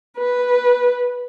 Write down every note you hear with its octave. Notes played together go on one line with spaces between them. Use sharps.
B4